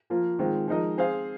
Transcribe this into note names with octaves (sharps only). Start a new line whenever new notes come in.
F3 A#3 F4
D#3 G#3 C4 F4
F3 G#3 D#4 A#4 D#5
C4 G#4 C5 F5